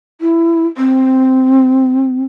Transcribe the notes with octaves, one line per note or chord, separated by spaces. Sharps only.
E4
C4